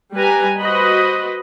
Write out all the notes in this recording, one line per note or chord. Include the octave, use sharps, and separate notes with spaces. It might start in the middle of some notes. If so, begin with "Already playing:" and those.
G3 G4 B4 G#5 A#5
F#4 B4 C5 D#5 B5